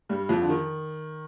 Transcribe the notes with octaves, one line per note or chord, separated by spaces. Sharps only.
G2 G3
F2 F3
D3
D#3